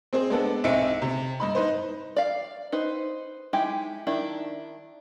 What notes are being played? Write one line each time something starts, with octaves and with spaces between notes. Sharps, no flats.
C4 G#4 C5
G#3 B3 D4 A4
B1 C4 E5 C#7
C3
G2 D#5 B5
D#4 B4 C5
D5 F5
D#4 B4 C5
G#3 D#4 E4 G4
D#3 D4 E4